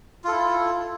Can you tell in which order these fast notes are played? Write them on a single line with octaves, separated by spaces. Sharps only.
F4 A4 E4